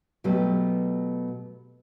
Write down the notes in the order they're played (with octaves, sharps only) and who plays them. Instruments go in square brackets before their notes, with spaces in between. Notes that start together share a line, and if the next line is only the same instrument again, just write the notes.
[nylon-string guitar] B2 F#3 A3 G4 B4